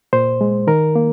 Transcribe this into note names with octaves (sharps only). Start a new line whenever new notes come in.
A#2 C5
G#3
D#3 A#4
A#3